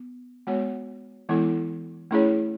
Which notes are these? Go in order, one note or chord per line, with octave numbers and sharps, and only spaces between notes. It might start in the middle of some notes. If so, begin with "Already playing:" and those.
Already playing: B3
G#3 B3 F#4 C#5
E3 G#3 B3 E4 A4
A3 C#4 E4 G#4 C#5